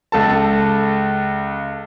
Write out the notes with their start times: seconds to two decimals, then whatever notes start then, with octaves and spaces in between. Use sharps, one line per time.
0.12 C#2 A4 A5